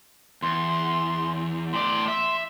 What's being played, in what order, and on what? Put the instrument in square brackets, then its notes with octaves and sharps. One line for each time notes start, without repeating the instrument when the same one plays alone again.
[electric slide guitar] E2 [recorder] C6
[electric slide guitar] A2 D5 [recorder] C6
[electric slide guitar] E5